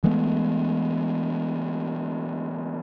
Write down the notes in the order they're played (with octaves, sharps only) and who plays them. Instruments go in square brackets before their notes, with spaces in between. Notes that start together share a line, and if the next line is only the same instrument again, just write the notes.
[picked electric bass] E3 G#3 A3 B3